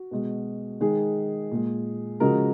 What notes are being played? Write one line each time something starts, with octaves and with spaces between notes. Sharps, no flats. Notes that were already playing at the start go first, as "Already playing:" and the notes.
Already playing: F#4
B2 G#3
D#3 G#3 G#4
A#2 G#3
C#3 F3 G#3 F#4 A#4